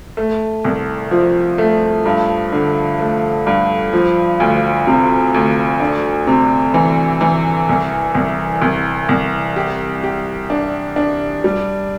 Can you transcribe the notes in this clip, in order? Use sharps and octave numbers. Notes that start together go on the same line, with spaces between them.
A3
C2
F3
A3
G2
D3
A3
G2
F3
D2
C3
D2
D4
C3
E3
E3
C2
C2
C2
C2
G4
G4
D4
D4
G3